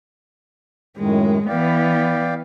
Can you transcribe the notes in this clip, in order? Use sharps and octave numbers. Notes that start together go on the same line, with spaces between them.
F#2 A2 D#3 G#3
E3 B3 D5 F5 G5